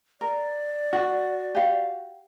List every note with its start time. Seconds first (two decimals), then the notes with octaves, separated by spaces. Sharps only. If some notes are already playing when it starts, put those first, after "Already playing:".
0.21 A#4 D5
0.93 F#4
1.55 G4 F5